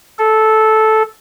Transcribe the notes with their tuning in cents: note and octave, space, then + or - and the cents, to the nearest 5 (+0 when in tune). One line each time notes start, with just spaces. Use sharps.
A4 -10